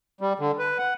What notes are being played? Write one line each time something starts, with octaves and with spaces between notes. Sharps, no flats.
G3
D3
B4
F#5